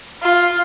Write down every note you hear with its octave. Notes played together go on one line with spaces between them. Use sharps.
F4